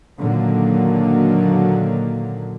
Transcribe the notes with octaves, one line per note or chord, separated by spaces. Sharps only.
A#2 D3 D#3 F#3 A#3